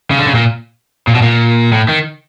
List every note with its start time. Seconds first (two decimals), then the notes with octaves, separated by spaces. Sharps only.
0.11 C#3
0.19 D3
0.26 C#3
0.35 A#2
1.07 A#2
1.15 B2
1.22 A#2
1.72 A2
1.89 D#3